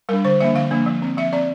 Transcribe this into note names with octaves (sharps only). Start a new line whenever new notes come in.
G3 D4 A#4
D3 C5
F3 A#3 D4 E5
D3 F5
F3 A#3 D4
F3
C4
F3 E5
C4 D5